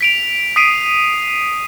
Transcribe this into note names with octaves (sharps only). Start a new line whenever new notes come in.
B6 D7 F7
D#6 B6 C7 D7 D#7